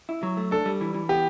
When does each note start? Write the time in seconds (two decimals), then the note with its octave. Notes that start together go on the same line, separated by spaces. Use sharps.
0.09 E4
0.23 F#3
0.37 A3
0.51 D4 A4
0.65 G3
0.81 E3
0.94 E3
1.09 B3 G4